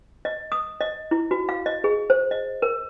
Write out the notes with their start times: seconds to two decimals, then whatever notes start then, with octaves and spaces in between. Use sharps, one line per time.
0.25 D#5
0.52 D#6
0.81 D#5
1.11 E4
1.31 F#4
1.49 F5
1.66 D#5
1.84 G#4
2.10 C5
2.31 D#5
2.62 A#4